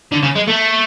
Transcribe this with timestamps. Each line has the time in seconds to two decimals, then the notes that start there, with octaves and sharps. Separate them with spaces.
0.12 D3
0.23 C#3
0.35 G#3
0.47 A3